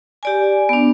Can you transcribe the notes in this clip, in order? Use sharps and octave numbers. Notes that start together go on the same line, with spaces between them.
G4 D5 G#5
B3 D4